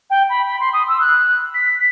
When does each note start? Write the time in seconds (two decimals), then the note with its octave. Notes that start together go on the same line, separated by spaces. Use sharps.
0.10 G5
0.29 B5
0.47 B5
0.60 C6
0.73 D#6
0.88 E6
1.00 F#6
1.54 B6